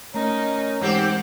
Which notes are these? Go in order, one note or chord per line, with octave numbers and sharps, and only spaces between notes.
A3 C#4 D#4 A#4
G#2 E3 G#3 C4 G4 F#5